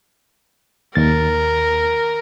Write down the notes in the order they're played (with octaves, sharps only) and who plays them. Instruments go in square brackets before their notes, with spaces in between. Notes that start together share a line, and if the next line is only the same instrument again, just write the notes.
[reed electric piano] D#2 A6 [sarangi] A#4